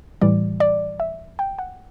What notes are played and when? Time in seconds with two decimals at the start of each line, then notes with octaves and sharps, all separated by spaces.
0.21 A2 E3 G3 D5
0.60 D5
1.00 E5
1.39 G5
1.59 F#5